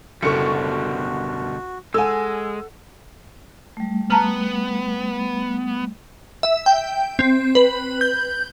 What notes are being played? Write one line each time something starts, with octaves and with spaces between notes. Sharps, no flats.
F#1 B2 D3 G3 F#4 A4 C#6 C#7
G#3 A4 F#5 G#5 E6
G3 A3
B3 A5 A#5 F6
E5
G5
C4
B4
G6